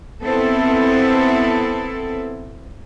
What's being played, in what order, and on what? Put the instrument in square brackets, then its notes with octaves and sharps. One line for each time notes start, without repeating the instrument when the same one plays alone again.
[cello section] B3 C4 E4 A4